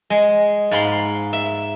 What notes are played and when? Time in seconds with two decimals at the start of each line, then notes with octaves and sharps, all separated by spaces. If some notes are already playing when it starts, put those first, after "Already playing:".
0.10 G#3
0.71 G#2 F5 B5 C6
1.33 E5